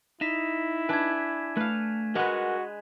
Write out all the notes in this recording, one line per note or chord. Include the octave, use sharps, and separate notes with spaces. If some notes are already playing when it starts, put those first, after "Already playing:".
D#4 E4 B6 E7
D4 B4 G#5 G#6
A3 B4 F5
G#3 F#4 A#4 B4 D#5 F#5